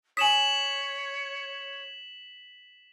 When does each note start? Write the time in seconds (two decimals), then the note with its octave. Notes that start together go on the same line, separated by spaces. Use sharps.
0.17 C#5 G#5 D#6 B6 E7 F#7